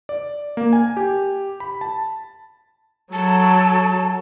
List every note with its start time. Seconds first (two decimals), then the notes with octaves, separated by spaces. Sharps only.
0.09 D5
0.57 A#3
0.73 G#5
0.97 G4
1.60 B5
1.81 A5
3.12 F#3 A4 A5